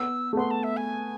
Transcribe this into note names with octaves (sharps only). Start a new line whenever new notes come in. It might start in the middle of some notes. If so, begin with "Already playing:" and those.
Already playing: B3 E6
A3
B3 C6
A5
E5
G#5